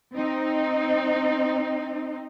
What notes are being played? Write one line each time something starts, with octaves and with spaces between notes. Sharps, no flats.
C4 D#4